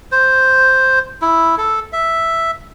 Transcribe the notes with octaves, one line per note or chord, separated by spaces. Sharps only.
C5
E4
A4
E5